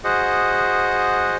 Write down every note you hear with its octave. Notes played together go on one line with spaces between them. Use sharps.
F#4 G#4 C5 D#5 F#5